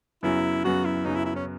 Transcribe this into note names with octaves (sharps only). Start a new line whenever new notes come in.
F#2 C#3 F#3 B3 E4
F#2 C#3 F#3 B3 F#4
E4
F#2 C#3 F#3 B3 D#4
E4
E4
C#4